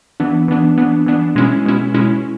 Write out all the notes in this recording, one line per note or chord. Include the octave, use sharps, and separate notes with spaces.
E3 B3 D4
E3 B3 D4
E3 B3 D4
E3 B3 D4
B2 G#3 C#4 E4
B2 G#3 C#4 E4
B2 G#3 C#4 E4